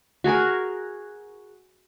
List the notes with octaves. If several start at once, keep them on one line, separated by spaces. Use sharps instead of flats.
F#4 G#4 A#4 G#5